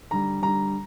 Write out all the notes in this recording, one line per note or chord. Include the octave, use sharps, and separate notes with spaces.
D3 G3 A#5
D3 G3 A#5